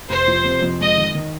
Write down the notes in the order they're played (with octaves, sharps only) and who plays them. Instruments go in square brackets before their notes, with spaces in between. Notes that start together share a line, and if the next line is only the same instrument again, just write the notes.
[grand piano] F1 [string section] C5
[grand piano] F3
C3
F2
[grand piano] G#3 [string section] D#5
[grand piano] D#3
D#3